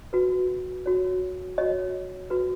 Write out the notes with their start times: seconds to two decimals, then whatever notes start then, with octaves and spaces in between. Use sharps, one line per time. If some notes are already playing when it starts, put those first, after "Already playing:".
0.13 F#4 B4
0.86 F#4 C#5
1.58 F#4 C#5 D#5
2.30 F#4 B4